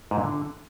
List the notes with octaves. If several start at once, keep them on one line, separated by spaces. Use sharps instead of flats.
G#2
A#2
D3